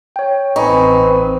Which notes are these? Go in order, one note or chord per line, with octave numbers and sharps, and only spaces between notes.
C#5 G5
A1 C4 D#4 B4 G#5 B5 C#6